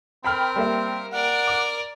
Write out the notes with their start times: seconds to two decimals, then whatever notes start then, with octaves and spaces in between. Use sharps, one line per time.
0.24 C4 A#4 G5 B5 F6
0.56 G3 A#3 E5
1.12 A#4 D5 F#5
1.47 D6